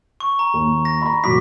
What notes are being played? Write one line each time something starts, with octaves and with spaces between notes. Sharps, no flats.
C#6
A#5
D#2
A#6
A#5 B5
E1 F#3 D6 B6